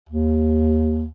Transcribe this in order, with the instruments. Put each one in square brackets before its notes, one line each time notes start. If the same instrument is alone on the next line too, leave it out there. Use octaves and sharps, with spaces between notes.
[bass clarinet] D#2